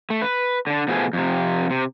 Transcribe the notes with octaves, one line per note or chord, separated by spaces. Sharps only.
A3
B4
D3 D4
B2 F3 A3 B3 G#4
F2 C3
C3